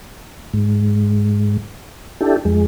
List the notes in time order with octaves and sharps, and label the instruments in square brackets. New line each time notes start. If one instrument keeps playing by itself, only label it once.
[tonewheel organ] G#2
D4 E4 G4 A4
F2 G#3